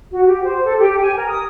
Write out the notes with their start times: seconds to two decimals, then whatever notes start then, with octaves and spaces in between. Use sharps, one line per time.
0.11 F#4
0.25 G4
0.44 C5
0.63 A4
0.77 G4
1.00 G#5
1.16 A#4
1.28 D#6